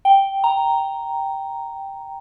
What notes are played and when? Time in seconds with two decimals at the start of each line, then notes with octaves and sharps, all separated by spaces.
0.05 G5
0.44 A#5